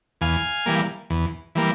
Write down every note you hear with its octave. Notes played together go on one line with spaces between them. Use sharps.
E2 F5 G#5
E3 G3 A#3
E2
E3 G3 A#3